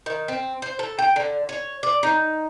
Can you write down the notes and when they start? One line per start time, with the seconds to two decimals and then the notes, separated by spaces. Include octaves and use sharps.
0.06 D#3
0.28 C4
0.62 C5
0.79 A4
0.99 G5
1.16 D3
1.49 C#5
1.83 D5
2.03 D#4